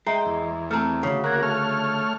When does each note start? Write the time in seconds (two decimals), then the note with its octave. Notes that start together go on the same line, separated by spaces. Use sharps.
0.07 G#3 E5 G5 A#5
0.26 E2
0.71 A3 C4 A5 A#5 F6
1.03 D2 C#3
1.24 A#3 F#4 A#4 F#6 G#6
1.43 A3 C#5 F6